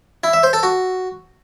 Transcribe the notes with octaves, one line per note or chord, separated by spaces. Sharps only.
E4
E5
C5
A4
F#4